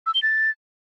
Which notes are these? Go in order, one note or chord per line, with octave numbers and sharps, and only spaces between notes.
E6
G7
A6